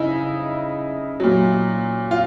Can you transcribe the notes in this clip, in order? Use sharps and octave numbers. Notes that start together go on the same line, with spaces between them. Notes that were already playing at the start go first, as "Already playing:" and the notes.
Already playing: C#3 D#4 E4
A#2 F#3
F4